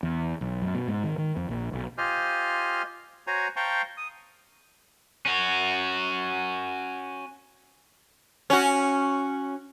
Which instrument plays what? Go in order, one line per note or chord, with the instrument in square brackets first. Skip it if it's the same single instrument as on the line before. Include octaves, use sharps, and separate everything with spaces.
[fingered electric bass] E2
B1
F#2
B2
G#2
D#3
D#3
F2
A#1
B1
[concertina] F4 G4 C5 D#5 G#5 F6
F#4 C5 C#5 G#5 A#5
C5 F5 G5 A5 A#5 C#6
D#6
[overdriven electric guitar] C#4 F#4
[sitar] C#4 F#4